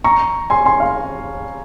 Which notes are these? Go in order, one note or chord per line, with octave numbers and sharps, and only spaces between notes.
A#5 C#6
G#5 C6
G#5 C6
F5